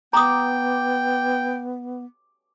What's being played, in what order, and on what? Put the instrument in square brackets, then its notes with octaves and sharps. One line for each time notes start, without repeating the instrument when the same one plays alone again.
[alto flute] B3 [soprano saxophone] G5 [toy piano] A#5 D#6 [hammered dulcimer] D6